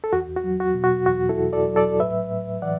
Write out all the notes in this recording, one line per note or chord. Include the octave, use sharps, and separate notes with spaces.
A4
E2 F#4
F#4
F#3
F#4
B2
F#4
E2 F#4
E4 A4
E2
A4 D5
F#3
A4 D5
A2 B4 E5
A2
E3 D5 F#5